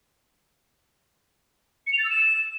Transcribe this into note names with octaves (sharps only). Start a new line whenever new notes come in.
C#7
F7
A6
E6
E7